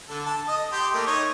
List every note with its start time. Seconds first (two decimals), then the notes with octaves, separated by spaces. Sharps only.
0.09 D3 A4
0.26 A5
0.48 D#5 D#6
0.72 G4 G5 C6
0.94 A3 A#3
1.07 D#4 C#5 D#5